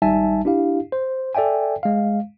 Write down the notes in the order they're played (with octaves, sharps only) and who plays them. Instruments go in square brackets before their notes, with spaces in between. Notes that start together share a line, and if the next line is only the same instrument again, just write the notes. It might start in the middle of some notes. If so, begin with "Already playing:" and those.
[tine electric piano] G#1 G3 D#4 E5 G#5 A5
D4 E4 G4 F5
C5
A4 D5 E5 G5 G#5
G#3 F5